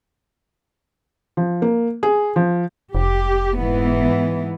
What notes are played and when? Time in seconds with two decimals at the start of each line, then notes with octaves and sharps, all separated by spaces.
1.37 F3
1.62 A#3
2.03 G#4
2.36 F3
2.95 F1 G4
3.57 G#2 E3 B3